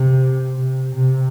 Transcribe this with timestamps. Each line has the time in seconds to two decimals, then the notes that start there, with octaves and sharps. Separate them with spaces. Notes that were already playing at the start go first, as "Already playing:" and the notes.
Already playing: C3
0.58 C3
0.95 C3